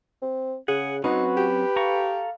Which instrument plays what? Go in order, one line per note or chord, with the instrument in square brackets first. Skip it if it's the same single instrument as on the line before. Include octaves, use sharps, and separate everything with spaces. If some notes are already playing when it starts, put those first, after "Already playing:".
[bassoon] C4
[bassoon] C#3 [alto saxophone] G#4 [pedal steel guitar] F#5
[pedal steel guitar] F#3 C4 C#4 [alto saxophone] D#4 [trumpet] F#4 [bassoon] B4
[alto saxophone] G4
[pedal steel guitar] A4 A#5 C#6 [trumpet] F5